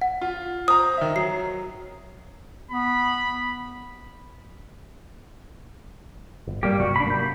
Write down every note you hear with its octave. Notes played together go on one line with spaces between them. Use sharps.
F#5
F4
C5 A#5 D#6
D#3 E5
F#3 C7
B3 B5
G1
G1 G3 A#3 G4
G#2 C3 F#3 F#4
D4 B5
A#3 G6